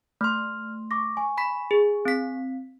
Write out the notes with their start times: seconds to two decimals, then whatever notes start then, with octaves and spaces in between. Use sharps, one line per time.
0.21 A3 C6 F6
0.91 C#6 D6 A#6
1.17 G#5 C#6
1.38 B5 B6
1.71 G#4
2.05 C4 B6